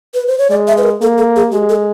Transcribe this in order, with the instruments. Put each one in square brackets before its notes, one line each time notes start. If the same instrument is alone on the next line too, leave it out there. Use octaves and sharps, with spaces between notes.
[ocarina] B4
C5
C#5
[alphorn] G#3 [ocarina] D5
[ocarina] E5
B4
A#4
[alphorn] A#3 [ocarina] A4
[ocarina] A4
G#4
[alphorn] G#3 [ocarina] G4
[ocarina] A4